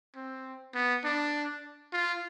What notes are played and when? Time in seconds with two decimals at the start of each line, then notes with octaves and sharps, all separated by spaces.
0.15 C4
0.74 B3
1.04 D4
1.93 F4